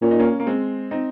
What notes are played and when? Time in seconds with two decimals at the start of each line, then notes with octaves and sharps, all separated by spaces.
0.02 A#2 C#4
0.11 D#4
0.19 A#3 C#4
0.40 A#3
0.47 G#3 C4
0.91 C4 D#4